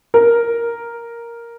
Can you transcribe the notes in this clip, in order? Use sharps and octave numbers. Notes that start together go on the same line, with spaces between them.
A#4